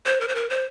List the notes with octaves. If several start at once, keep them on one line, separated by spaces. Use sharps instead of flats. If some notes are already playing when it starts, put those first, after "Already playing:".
C5
A#4
C5
A#4
C5